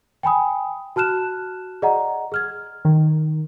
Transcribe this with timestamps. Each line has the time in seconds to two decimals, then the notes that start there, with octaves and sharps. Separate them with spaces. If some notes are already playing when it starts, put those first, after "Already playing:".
0.23 G5 G#5 B5 D#6
0.96 F#4 A5 F6 F#6 E7
1.82 G#4 D5 D#5 F#5 A#5
2.32 G#4 F6 G#6
2.85 D#3